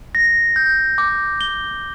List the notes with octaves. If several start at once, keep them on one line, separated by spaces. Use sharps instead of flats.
A#6
G6
D6
G7